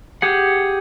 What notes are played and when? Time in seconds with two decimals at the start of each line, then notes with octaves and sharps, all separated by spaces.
0.22 G4 G#4 F#5